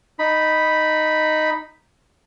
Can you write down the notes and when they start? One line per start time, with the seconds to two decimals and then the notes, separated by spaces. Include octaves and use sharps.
0.19 D#4 B5